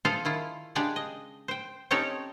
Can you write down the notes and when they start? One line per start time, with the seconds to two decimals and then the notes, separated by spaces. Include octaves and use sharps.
0.05 F4 G#4 A4 C5 F5
0.25 D#3 E4 F4
0.75 C#3 G#3 D4 G4 G#4
0.96 D#5
1.48 C5 G5
1.91 C4 C#4 D#4 G4 A4 C#5